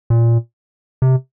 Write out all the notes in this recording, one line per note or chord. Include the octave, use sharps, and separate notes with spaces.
A#2
C3